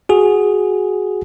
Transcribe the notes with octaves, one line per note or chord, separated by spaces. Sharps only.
F#4 G#4